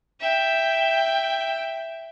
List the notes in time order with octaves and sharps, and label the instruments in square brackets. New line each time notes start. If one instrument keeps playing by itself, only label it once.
[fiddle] E5 G5